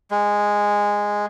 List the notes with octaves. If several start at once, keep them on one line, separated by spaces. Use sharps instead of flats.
G#3